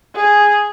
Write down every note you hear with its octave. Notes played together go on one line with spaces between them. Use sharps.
G#4